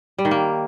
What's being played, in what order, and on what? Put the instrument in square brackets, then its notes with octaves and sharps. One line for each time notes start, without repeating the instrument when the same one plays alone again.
[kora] G3
D#3
A#3